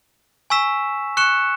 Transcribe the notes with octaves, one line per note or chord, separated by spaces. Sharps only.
G#5 C#6 E6 B6 E7
C#6 F#6 C#7 E7